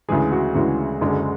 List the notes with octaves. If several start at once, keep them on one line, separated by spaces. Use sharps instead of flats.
D2 C#3 E3 G#3 G#4
F#4
D2 C#3 E3 G#3 F#4
F#1 F#2 D3 G#3